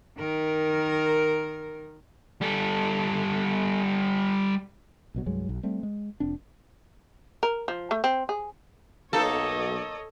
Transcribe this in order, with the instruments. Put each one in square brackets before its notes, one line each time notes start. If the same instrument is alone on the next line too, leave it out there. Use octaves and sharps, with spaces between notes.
[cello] D#3 A#4
[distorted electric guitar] G3 A4
[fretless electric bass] A#1 B2 F#3
C2 G2 F#3 G#3
B1
G3 A3 C4
G#3
F1 C4 D4
[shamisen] A#4
F3
A3
C4
G#4
[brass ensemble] B1 [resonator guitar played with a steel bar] A#3 D#4 [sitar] A4 [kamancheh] C#5 D#5